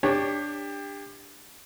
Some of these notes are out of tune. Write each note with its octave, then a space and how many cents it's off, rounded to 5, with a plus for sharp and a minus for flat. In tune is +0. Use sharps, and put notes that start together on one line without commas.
D4 +5 G4 +25 C#5 +0